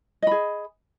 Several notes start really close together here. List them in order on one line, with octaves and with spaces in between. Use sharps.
D#5 B5 G#4